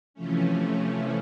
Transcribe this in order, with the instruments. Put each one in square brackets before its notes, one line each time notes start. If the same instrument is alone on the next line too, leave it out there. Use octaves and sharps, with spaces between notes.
[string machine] C3 E3 F3 A3 C#4